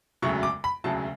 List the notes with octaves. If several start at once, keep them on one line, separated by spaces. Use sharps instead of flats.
E1 D2 C#3 F#3 A3 C#6
D6
B5
E1 D2 C#3 F#3 A3 A5